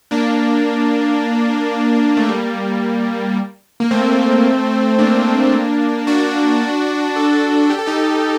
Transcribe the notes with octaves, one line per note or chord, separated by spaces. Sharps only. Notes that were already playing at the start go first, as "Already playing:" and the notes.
A#3 D4
A3
G3 A#3
A#3
A3 C4
A#3 D4
D4 F#4
F#4 A4
G4
A4
D#4 G4